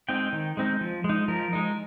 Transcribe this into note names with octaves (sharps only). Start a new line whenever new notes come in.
G#3 C4 D#4 G5
D#3
G#3 C4 D#4
F3
G#3
D#4
F3 A#4
G#3 D#4